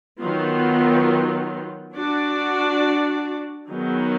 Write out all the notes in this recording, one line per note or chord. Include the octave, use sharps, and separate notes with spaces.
D#3 F#3 B3 F4
D4 F#4 D5
D#3 F#3 B3 D#4 G#4